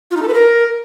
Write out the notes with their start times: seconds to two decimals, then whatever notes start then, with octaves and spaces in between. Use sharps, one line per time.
0.11 F4
0.17 D#4
0.22 A4
0.28 B4
0.34 A#4